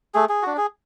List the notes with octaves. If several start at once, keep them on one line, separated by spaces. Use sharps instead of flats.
A3 G#4
G#4
D4 F#4
G#4